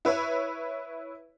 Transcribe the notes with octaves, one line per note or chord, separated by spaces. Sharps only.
E4 B4 C#5 E5